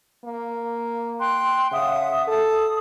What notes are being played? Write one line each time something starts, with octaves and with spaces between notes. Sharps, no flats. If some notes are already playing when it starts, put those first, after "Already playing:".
A#3
G5 C6 F#6
C#3 E5 F#5 D#6
A4 D#6